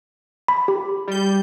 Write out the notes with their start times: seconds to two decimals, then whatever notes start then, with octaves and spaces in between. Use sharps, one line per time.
0.48 B5
0.68 G4
1.08 G3 G6